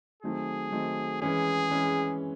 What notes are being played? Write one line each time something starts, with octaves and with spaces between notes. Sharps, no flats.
D#3 F#3 A3 C4 D#4 G#4
D#3 F#3 A3 C4 D#4
E3 G#3 C#4 G#4
E3 G#3 C#4